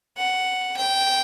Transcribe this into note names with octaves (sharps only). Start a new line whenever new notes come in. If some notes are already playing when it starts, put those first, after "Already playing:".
F#5
G5